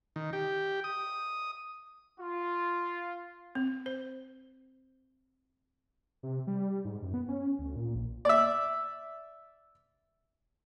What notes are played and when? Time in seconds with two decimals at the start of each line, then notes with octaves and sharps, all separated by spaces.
0.16 D#3
0.33 G4
0.84 D#6
2.20 F4
3.55 C4
3.86 C5
6.23 C3
6.47 G3
6.69 G3
6.85 G#2
7.02 F#2
7.14 B3
7.28 C#4
7.59 D2
7.76 A#2
7.95 A#1
8.25 D5 E5